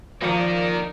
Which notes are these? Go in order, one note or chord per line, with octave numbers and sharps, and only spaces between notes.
D#3 F3 A#3 D#4 D5 C#7